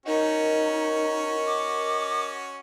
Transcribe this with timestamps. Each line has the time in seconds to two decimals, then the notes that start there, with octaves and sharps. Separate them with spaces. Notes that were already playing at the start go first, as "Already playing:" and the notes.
0.06 C#4 D#4 F#4 A#4 D#5
1.45 D6